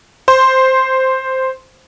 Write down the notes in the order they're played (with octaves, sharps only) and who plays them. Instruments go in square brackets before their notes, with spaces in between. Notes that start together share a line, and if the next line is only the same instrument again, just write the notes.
[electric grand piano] C5 C6